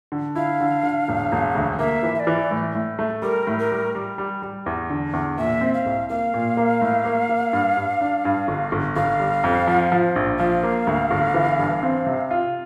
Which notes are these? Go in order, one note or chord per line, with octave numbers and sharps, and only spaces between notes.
D3
E4 F5
D3
D3
E1
E1
D2
A#3 E5
E3
E5
D5
E3
A2
A2
A3
G3 A#4
A2
A#4
G3
G3
G3
G3
E2
D3
E2
A#2 E5
C4
F5
C2
A#3 F5
A#2
A#3
A2
A#3
A#3
G2
G2
D4
G2
G1
G1
G1 F5
G3
F2
F3
F3
A#1
F3 F5
A#3
D2
G1
E3
G2
C4
C3
F4